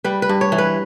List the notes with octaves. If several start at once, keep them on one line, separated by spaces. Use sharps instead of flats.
G3 B4
B4
G2
C#5
E3
B4